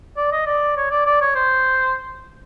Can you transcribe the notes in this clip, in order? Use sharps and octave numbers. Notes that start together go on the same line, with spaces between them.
D5
D#5
D5
C#5
D5
D5
C#5
C5